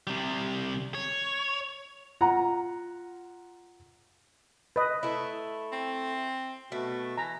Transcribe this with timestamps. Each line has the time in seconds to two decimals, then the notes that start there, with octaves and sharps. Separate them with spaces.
0.07 C3 G3
0.95 C#5
2.21 F4 F#5 A#5
4.76 B4 D#5
5.03 A3 E4
5.73 C4
6.72 B2 A3
7.18 E3 A#5